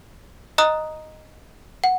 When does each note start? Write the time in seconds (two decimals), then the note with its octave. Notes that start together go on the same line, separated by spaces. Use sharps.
0.58 D#5 A#5 D#6 F#6
1.84 F#5